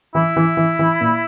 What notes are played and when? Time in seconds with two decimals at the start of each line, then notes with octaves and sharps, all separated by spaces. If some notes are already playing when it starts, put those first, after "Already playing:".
0.15 E3 E4
0.37 E3
0.57 E3
0.79 E3
1.01 A#2